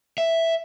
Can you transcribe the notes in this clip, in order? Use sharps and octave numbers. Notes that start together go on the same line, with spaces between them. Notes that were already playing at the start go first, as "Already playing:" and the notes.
E5